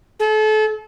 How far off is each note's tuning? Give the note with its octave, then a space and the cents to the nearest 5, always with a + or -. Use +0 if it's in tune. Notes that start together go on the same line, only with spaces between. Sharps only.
A4 -35